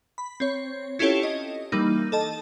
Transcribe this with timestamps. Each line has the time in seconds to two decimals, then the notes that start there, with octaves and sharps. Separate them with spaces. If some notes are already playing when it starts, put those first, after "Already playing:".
0.18 B5
0.40 C4 C#5
0.99 C#4 E4 F4 G4 A4 C#5
1.23 D#5
1.72 E3 G3 A#3 D#4
2.12 A4 D#5 A5